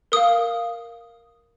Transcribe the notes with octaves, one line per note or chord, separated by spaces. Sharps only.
A#4 F5 D#6